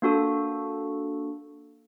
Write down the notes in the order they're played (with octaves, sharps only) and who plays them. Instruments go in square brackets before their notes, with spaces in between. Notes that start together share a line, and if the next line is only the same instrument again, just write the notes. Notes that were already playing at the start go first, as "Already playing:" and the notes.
[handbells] A#3 D4 F#4 A4